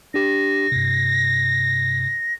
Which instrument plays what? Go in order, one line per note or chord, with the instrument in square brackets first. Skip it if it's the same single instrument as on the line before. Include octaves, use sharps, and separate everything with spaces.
[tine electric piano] D4 G4 [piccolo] A#6
[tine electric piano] G2 C3